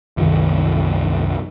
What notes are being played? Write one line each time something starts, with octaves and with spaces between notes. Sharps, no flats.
C2 F#2 D#3